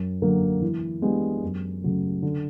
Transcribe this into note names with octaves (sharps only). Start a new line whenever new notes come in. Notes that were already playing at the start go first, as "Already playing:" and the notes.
Already playing: F#2
D3 F#3 A#3
E3
G#3 B3 D4 G4
F#2
C#3 F#3 A3
D3